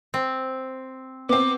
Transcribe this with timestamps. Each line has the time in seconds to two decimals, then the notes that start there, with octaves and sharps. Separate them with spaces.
0.14 C4
1.29 B3 C4 D6